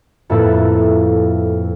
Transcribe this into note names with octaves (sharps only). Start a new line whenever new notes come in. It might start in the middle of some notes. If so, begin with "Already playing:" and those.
F2 A2 A#3 E4 A4 B4